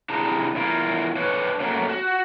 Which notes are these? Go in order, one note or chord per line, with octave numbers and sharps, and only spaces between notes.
C3 D4 E4 G#4 A5 A#5
E2 E4 F4 A#4
D4 B4 C#5
F#3 A3 A#3 C#4
F#4